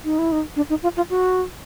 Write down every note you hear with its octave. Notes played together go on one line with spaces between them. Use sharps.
D#4
E4
D#4
D4
D#4
F4
F4
F#4